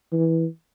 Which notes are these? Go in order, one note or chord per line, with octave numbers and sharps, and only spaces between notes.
E3